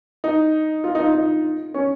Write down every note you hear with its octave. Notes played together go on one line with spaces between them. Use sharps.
D#4
F4
D#4
F4
D#4
C#4